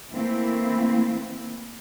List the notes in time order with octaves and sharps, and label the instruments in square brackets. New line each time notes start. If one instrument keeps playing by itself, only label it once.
[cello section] E3 A3 A#3 C4 E4